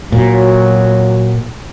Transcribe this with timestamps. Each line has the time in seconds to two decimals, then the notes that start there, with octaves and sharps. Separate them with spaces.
0.12 A#2 F#3